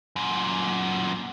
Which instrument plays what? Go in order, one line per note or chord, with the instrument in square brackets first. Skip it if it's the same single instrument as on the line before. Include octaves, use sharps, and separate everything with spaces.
[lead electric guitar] F#2 A#2